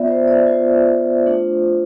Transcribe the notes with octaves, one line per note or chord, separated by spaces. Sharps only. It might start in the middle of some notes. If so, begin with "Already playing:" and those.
Already playing: B3 F4 D5 E5
C5
D5
B3 F4 C5
A3 D4 F4